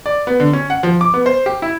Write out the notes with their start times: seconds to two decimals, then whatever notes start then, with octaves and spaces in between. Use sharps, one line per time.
0.06 D5
0.27 B3
0.40 D3
0.53 C#4
0.70 F#5
0.83 F3
1.01 D6
1.14 B3
1.26 C5
1.46 G4
1.62 E4